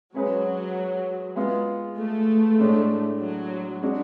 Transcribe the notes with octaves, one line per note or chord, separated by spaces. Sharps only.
F#3 G#3 C#4 G#4 B4
G#3 B3 F4 G#4
A3
A2 G#3 D4
F#3
G#3 D4 F#4